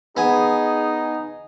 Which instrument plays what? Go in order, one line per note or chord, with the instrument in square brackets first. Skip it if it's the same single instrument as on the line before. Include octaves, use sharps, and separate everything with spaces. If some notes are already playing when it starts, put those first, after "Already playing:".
[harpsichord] B3 G#5 [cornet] D#4 [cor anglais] G#4